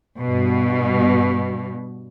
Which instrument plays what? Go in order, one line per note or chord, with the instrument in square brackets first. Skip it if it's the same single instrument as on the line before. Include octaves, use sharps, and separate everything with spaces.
[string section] G2 B2